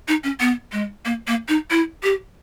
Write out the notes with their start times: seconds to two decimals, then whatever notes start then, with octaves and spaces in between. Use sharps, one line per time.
0.08 D#4
0.24 C#4
0.40 B3
0.72 G#3
1.05 A#3
1.27 A#3
1.49 D#4
1.71 E4
2.03 G4